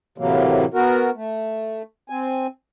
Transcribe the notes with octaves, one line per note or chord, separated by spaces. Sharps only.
A2 C3 E3 F#3 A#3
B3 F#4 A#4
A3
C4 G#5